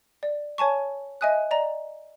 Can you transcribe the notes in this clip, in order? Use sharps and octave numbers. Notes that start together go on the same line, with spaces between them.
D5
C#5 G#5 A5 C#6
D#5 E5 G#5 D#6 F#6
D5 D#5 A#5